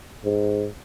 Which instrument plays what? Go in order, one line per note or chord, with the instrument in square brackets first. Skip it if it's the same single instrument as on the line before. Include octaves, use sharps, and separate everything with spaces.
[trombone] G#2